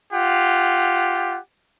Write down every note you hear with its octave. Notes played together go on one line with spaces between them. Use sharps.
F4 G4 F#5